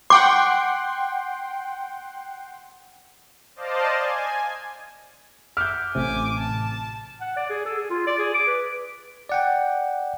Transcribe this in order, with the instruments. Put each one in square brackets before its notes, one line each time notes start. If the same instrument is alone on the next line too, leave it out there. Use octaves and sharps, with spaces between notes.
[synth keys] F#5 G5 C6 [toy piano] D6
[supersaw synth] C5 D5 D#5 F5 A5
G#5
[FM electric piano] E5 F#5 D6 [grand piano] F6 G6
[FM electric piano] A1 A2 C3 [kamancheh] G#5 D6
[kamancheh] A5
[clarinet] F#5
D5
G#4
A4
G#4
F4
D5
G#4
D6
B4
[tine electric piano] D5 F#5 G5